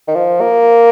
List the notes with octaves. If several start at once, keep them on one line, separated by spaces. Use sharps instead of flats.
D#3
F3
A#3